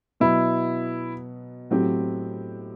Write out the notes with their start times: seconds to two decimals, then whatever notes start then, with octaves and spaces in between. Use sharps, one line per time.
0.20 B2 F#3 B3 E4
1.70 A2 F#3 C4 G4